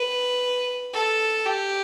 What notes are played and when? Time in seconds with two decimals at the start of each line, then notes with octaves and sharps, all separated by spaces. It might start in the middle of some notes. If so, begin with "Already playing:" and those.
Already playing: B4
0.94 A4
1.46 G4